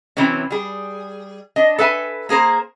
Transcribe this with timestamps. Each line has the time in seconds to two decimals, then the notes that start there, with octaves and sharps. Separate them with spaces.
0.17 C3 E3 F#3 C4 C#4
0.51 G3 G#4
1.56 D4 D#5
1.78 A4 B4 E5 G#5
2.29 A#3 G#4 A#4 C5